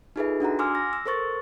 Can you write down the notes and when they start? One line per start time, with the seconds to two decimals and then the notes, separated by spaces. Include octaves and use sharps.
0.16 D#4 F4 G#4 A4 B4 E5
0.40 D4 F#4 F#5 A#5
0.59 G#5 C6 D6 E6 F6
0.75 A#6
0.93 E6
1.06 A4 A#4 C5 C#6 A6